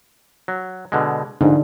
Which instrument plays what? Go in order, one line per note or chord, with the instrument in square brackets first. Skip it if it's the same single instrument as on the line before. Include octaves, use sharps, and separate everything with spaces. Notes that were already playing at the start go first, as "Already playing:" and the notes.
[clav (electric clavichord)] F#3
B2 D3 G#3
[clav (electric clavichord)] A#1 G#2 [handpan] D3 D4 D#4